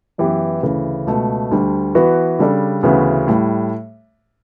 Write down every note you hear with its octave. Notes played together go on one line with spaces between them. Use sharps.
F#2 E3 B3 E4 G4
D2 C#3 E3
C#2 B2 A3
D2 D3 G3
E3 B3 F#4 B4
C#3 G3 D4 A4 D5
D2 C#3 E3 B3 F#4
A2 G3